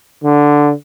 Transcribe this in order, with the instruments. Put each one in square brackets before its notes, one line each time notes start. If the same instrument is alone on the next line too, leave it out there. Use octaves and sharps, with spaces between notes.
[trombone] D3